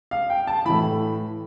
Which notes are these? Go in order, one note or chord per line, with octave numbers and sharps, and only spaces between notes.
F5
G5
A5
A2 E3 B5